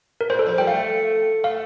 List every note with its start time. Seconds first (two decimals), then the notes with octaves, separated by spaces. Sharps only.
0.21 A#4
0.30 A#2 C5
0.39 A4
0.46 F3 C5
0.58 G3 G5
0.67 A3 F5
1.44 A3 F5